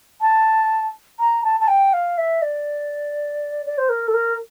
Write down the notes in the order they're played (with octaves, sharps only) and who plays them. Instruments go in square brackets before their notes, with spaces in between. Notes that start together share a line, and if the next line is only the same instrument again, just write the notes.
[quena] A5
A#5
A5
A5
G5
F5
E5
D5
D5
C5
A#4
A4
A#4